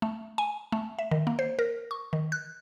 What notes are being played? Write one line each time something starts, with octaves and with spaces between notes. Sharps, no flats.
A3
G#5
A3
E5
D#3
A#3
C5
A#4
C#6
D#3
F#6